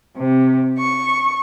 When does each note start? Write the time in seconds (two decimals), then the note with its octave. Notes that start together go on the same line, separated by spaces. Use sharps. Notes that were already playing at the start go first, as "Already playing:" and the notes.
0.18 C3
0.78 C#6